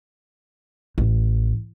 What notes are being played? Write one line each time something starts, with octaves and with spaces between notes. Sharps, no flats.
A1